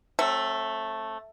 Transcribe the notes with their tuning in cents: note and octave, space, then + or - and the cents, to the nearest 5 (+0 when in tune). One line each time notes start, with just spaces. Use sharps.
F#3 +0 A3 +0 C4 +45